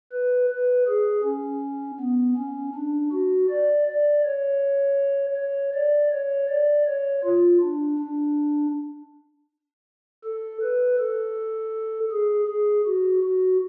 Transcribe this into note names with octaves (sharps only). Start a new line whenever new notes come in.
B4
B4
G#4
C#4
B3
C#4
D4
F#4
D5
D5
C#5
C#5
D5
C#5
D5
C#5
F4
D4
D4
A4
B4
A4
G#4
G#4
F#4
F#4